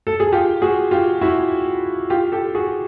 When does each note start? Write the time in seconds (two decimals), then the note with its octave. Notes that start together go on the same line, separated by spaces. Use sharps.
0.07 A4
0.20 G#4
0.32 F4 G4
0.62 F#4 G#4
0.91 F4 G4
1.21 E4 F#4
2.10 F4 G4
2.32 G4 A4
2.55 F#4 G#4